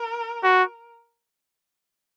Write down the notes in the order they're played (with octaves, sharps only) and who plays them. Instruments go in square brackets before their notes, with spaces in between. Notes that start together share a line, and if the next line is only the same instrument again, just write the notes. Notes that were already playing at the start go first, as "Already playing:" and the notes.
Already playing: [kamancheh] A#4
[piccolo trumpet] F#4